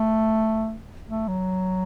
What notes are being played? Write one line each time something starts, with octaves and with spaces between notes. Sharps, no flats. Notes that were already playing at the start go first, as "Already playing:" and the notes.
Already playing: A3
A3
F#3